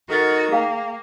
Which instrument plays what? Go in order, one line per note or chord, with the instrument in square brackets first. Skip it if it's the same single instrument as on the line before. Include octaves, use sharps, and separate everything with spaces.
[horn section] D#3 [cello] F#4 [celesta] A4 A6
[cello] A#3 [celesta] G#4 F5 G5